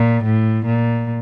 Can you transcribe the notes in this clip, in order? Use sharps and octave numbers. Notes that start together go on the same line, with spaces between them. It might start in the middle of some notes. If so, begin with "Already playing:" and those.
Already playing: A#2
A2
A#2